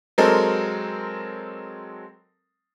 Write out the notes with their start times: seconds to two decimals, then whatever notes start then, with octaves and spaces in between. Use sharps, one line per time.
0.18 F#3 G#3 C4 A4 A#4 D#5